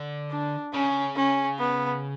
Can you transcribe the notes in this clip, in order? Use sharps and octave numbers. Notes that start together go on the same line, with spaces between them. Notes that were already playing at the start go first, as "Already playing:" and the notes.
Already playing: D3
D4
C#3 C#4
C#4
B3